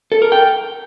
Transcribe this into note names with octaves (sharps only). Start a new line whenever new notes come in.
A4
A#4
G5